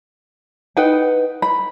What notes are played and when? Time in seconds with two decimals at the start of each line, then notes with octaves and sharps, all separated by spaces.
0.77 D#4 B4 F#5 G5
1.42 B5